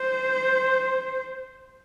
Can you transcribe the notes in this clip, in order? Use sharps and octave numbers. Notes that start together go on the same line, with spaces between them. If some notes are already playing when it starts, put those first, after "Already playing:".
Already playing: C5